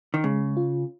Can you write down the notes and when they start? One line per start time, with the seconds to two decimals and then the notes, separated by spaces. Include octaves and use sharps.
0.14 D#3
0.24 C#3 G#3
0.57 F4